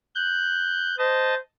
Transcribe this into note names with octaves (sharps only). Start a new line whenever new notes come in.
F#6 G6
C5 D#5 A5